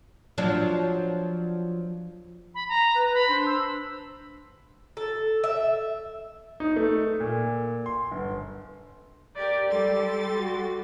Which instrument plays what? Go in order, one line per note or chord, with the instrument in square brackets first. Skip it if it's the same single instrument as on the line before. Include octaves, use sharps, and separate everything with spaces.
[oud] F3 F#3 D4
[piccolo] B5
A#5
[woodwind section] B4
[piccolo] B5
[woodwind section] D4 C5
[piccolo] E6
[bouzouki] A4
E5
[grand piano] D#4
A3
A3
A#2
C6
G1
[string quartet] G4 A#4 [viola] D5
[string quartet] G3 C6 A6 [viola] A4
[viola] F#4